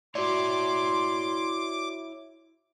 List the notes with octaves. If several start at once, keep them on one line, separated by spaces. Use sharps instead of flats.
E4 F#4 C#5 D5 C6 D6